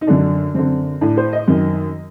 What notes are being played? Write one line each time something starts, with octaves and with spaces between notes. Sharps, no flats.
D#4
F#2 D3 D4
F#2 D3 C4
A2 D4
C5
D#5
F#2 D#3